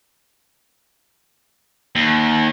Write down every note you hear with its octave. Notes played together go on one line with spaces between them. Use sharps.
D#2